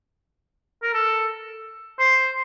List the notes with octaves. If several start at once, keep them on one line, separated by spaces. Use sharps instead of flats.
A#4
A4
C5